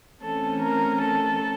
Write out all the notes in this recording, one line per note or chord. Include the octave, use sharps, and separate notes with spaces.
C3 E3 A3 C#4 A4
A#4
A4